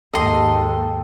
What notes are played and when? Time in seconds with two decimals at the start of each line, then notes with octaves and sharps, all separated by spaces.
0.14 D#2 G#2 A4 D#5 G5 C6